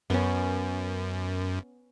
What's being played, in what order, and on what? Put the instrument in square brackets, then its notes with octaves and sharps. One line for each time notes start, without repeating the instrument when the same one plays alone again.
[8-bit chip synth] F#2 [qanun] B3 C#4